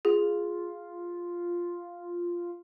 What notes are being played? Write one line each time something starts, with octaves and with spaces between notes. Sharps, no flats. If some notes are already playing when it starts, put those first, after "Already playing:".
F4 G#4